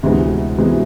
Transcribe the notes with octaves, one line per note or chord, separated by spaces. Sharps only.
D2 C3 E3 G#3 B3
C3 E3 G#3 B3